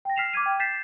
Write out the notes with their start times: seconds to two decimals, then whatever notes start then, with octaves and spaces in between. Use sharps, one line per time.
0.05 G5 A#6
0.16 F6 B6 C7 E7 F7
0.33 D6 F6 G#6 D#7
0.46 G5
0.59 G6 A6 B6 C7 E7